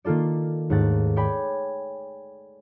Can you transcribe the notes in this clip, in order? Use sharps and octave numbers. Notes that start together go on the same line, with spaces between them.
D#3 A#3 F4 A4 D5
D#2 G#2 A3 F#5 A6
C#5 D5 G5 G#5 B5